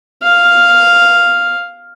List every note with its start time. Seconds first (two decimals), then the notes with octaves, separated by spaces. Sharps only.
0.22 F5